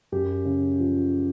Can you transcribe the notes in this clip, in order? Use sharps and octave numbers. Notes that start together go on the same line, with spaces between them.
F#2 G4
C#3
F3